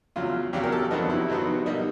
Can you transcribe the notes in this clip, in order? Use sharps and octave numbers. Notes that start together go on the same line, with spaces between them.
E2 C#3 F#3 F4
E2 C#3 F#3 G4
A#4
A4
F2 C3 D#3 F#3 B3 D#4
E4
F2 C3 D#3 F#3 B3
B2 G3 A#3 D#4